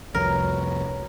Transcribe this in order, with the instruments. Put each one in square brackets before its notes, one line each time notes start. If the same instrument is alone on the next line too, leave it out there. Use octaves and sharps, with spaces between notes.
[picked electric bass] C2 F2 [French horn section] F#4 B4 C#5 [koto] A#4